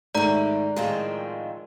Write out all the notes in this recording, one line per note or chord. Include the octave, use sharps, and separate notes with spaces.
G#2 D#3 A3 E4 G4 D5 A#5
A2 D#3 F3 G#3 C4 G#4